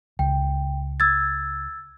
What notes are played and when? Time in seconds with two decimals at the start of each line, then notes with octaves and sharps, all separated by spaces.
0.19 C#2 G5
1.00 E6 G#6 A6